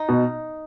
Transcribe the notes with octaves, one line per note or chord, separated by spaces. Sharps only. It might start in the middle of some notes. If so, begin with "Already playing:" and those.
Already playing: D#4
B2